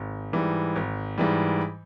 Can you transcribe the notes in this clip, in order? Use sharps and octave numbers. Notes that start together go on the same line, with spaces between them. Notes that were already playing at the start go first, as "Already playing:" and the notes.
Already playing: G#1
G#2 E3 G3
G#1
G#2 E3 G3